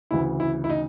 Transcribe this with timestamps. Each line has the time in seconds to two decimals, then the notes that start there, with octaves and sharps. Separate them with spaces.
0.11 D2 C#3 E3 E4
0.40 E4
0.64 E4
0.70 D#4